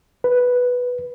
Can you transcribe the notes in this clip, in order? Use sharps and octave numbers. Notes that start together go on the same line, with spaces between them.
B4